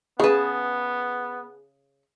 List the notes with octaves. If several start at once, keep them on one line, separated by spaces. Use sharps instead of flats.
C#3 B3 G#4 B4 A5